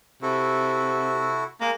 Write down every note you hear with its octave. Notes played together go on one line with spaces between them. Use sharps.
C3 E4 F#4 A4
G#3 A#3 A#5